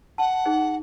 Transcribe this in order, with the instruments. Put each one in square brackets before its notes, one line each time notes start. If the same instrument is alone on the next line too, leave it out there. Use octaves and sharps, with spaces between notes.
[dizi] F#5 [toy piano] A5
[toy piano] D#4 G#4 C5